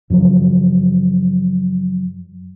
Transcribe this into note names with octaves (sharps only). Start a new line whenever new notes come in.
F#2 C#3 F3 F#3